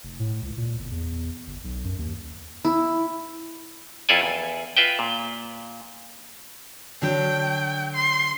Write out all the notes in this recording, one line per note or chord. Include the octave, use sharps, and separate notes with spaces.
F1
A2
C#2
A#2
G1
E2
G1
B1
F#2
D#2
E4
F2 E4 F4 A4 D5 G#5
E2
F4 B4 E5 G5
A#2
D3 F#3 D4 G5
C6